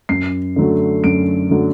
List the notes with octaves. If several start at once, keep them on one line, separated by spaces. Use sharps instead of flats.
F#2 C7
D3 F#3 A3
F#2 D7
D3 F#3 A3